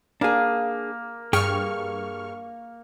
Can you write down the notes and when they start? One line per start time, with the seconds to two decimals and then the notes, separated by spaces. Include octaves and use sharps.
0.21 A#3 D4 G#4
1.33 G2 G#4 G5 C#6 F6